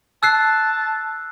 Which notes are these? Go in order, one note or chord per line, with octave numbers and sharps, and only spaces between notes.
A5 E6 F#6 C7